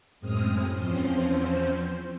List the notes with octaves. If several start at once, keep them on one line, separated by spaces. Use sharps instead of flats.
F#2 A2 G#3 C4 D#6 F6
E2 F3 C4 C#4 C5